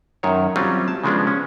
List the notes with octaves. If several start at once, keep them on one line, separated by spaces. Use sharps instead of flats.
F#2 D#3 C#5
F#3 G3 C4 C#4 F4
A5
C#3 F3 G#3 B3 D4
C#4